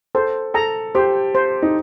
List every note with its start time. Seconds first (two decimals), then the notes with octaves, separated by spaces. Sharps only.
0.15 A4 C5
0.54 A4 A#5
0.95 G4 C5
1.35 C5
1.62 D#4